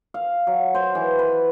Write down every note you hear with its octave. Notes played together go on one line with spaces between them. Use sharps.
F5
F#3
C5
E3
B4